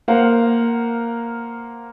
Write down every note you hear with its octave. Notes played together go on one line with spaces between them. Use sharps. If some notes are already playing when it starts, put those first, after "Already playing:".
A#3 A#4 C5 F5 F#5